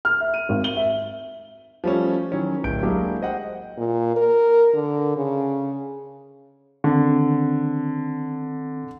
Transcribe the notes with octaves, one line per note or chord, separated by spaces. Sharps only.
F6
E5
D#7
G#1
G7
E5
F3 G3 A3 C#4
D#3 E3 F#3 C#4
D1 G6 D7
F#3 G#3 A#3 D4 E4 G4
C5 D#5 F#5 G5
A#2
A#4
D3
C#3
D3 D#3 C4